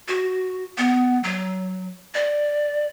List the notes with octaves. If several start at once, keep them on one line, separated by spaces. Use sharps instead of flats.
F#4
B3
F#3
D5